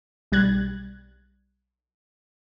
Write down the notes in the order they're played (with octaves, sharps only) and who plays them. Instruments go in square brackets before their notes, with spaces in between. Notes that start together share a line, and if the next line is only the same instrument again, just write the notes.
[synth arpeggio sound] B1 G3 F#6 G#6